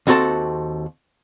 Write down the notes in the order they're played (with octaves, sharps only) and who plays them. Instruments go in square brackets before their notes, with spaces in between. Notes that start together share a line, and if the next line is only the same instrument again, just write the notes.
[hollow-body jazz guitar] D#2 C4 F#4 G#4 A4 A5